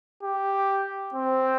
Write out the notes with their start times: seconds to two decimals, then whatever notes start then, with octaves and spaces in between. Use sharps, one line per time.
0.23 G4
1.14 C4